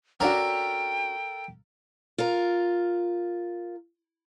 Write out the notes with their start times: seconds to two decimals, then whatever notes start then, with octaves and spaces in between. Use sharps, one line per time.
0.20 C#4 D4 F#4 A4 A#4 F5 G5
2.18 F4 A#4